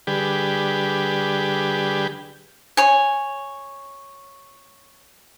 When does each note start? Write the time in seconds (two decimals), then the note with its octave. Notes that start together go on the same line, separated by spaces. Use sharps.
0.07 D3 G3 G4 G#4 B4
2.77 C#5 G#5